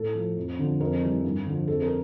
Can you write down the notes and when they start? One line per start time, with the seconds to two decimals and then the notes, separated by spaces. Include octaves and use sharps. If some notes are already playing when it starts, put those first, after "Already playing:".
Already playing: A2 A4
0.15 F3
0.36 F2
0.59 D3 F3
0.80 F2 A#4
1.03 E3 G3
1.24 G2
1.46 D3 F3
1.68 F2 A4
1.82 A#4